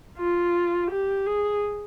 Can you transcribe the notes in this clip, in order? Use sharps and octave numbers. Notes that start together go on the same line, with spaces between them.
F4
G4
G#4